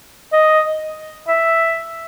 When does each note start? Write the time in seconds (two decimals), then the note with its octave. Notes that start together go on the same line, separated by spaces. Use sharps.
0.33 D#5
1.28 E5